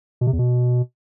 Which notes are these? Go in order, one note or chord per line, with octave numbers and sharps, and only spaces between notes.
B2
C3
E2
B2